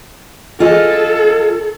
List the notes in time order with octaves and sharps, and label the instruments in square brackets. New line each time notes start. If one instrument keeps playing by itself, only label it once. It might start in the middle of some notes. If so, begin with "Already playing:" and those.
[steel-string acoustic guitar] F4 G#4 D#5 [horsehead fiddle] A4